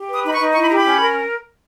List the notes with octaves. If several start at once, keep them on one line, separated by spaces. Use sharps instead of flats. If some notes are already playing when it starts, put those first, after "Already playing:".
Already playing: G4
B4 D#6
D#4 B5
C#6
D#4
E4 C#6
B5
G4 A#5
B5
C#4
A#4